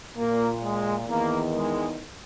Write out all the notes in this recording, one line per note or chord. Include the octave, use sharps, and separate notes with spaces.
A#2 A#3
G#3
E2 D#3 A#3
G#3